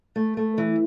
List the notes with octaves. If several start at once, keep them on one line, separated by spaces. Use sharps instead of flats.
A3
A3
E3